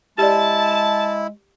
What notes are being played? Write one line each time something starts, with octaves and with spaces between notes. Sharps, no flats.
G#3 E4 G4 D5 A5